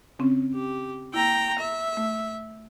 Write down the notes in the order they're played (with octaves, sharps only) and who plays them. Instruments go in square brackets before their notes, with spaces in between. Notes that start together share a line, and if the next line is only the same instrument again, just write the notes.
[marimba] C#3 C4 C#4
[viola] G4
[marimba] A#3 E4 [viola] G5 A#5
[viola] E5
[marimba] A3